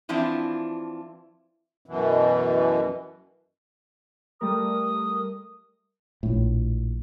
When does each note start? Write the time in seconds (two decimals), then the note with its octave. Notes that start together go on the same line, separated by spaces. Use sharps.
0.09 E3 F3 C4 D4 E4 F4
1.86 F#2 B2 E3
4.41 G3 A3 A#4 D#6
6.23 A#1 A2